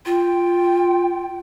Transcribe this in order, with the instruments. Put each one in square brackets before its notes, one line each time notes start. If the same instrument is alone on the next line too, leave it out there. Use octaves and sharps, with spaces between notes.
[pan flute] F4 [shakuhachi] G5